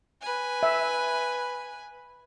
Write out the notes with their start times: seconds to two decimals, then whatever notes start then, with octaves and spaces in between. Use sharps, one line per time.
0.21 B4 G#5
0.63 E5